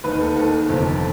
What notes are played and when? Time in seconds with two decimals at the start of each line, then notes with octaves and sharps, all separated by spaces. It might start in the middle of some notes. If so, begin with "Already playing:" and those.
0.04 D#2 D#3 B4
0.21 A4
0.36 D#2 D#3 A4
0.69 G1 F2 C3 D#3